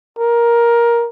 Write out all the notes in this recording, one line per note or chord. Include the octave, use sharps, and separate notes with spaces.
A#4